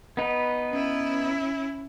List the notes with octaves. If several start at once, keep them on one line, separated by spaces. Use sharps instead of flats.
B3 D#4 B4
C#4 E4